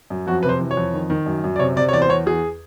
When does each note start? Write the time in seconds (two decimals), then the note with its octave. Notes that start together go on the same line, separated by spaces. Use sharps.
0.10 F#2
0.27 F2 F#4
0.43 C3 B4
0.49 C5
0.60 E3
0.71 C#5
0.77 F2
0.94 D#3
1.10 D#3
1.26 F#2
1.44 F#2
1.56 D5
1.59 C3 C#5
1.76 C3 D5
1.89 C#5
1.93 E2 D5
2.02 C5
2.09 E2 C#5
2.26 E2 G#4